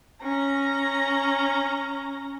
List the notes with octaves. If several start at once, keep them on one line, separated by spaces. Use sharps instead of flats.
C#4 A#5